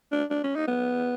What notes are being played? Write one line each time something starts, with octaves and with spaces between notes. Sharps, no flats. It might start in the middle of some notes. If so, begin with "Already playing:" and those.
D4
D4
C#4
D#4
B3